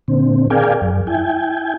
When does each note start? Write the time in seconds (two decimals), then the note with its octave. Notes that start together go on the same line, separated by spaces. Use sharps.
0.08 A#2 D3 C4
0.50 G#4 A#4 D5 F5 G5 G#5
0.81 F#2
1.07 E4 G5 G#5